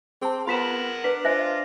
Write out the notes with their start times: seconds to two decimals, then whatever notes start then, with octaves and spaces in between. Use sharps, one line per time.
0.22 C4 G#4 A5
0.47 B3 F4 A#4 F#5 C6 B6 E7
1.04 D4 B4 B6
1.25 F4 C5 D#5 E5 G#5 A#6